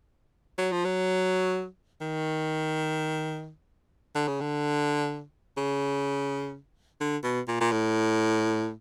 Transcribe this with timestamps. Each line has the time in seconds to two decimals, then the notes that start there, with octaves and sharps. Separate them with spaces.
0.58 F#3
0.72 F3
0.85 F#3
2.01 D#3
4.15 D3
4.28 C#3
4.41 D3
5.57 C#3
7.01 D3
7.24 B2
7.48 A#2
7.61 A#2
7.72 A2